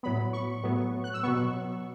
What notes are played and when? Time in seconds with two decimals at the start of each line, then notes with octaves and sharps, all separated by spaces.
0.03 A2 F#3 B3 B5
0.33 C#6
0.64 A2 F#3 B3
1.04 F#6
1.14 E6
1.23 B2 F#3 B3 C#6